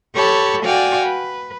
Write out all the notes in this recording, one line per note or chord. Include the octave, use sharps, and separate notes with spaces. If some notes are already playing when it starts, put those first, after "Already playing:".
G4 A4 C#5 A5 B5 C#6
F#4 D5 F5 G5 G#5
B4